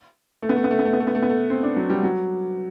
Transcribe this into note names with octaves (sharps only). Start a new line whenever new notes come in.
A3
B3
A3
B3
A3
B3
A3
B3
A3
B3
A3
B3
A3
C4
D4
F#3
G3
F#3